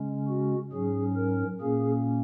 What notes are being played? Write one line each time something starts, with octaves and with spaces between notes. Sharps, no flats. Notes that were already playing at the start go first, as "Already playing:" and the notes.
Already playing: C#3 G#3 C#4
F#4
G#2 F#3 C#4 G#4
A#4
A#2 A#3 C#4 G#4